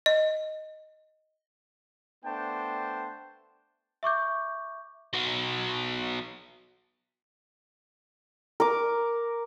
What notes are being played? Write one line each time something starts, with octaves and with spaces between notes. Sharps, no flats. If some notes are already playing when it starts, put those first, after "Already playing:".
D#5
A3 B3 D4 C5 G5 A5
E5 C#6 D6 G6
F#3 B3
A#4 D6